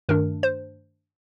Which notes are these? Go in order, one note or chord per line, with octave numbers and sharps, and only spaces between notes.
G2 D#3 A3 D4 A#4
C5